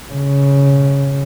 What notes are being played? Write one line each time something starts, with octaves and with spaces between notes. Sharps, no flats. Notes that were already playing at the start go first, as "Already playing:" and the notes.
C#3